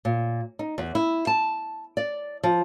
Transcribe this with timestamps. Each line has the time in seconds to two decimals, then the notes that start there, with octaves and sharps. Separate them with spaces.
0.05 A#2
0.59 D#4
0.78 E2
0.95 E4
1.27 A5
1.97 D5
2.43 F3